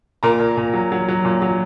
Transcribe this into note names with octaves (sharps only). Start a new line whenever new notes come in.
A#2 A#4 A#5
A#2
A#2
F#3
F#3
F#3
A#2
F#3